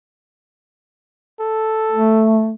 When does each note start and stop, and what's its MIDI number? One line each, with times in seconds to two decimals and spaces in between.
1.40 2.27 69
1.92 2.53 57